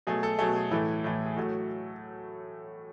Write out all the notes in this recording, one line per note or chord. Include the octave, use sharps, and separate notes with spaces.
B2 F#3 A3 G#4
A4
B2 F#3 A3 G#4
G#4
A2 E3 A3 E4
A2 E3 A3
G#4
A2 F#3 A3 F#4